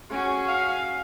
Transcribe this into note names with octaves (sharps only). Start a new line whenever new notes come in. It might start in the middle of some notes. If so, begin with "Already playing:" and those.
C#4 F#4 G#4
F5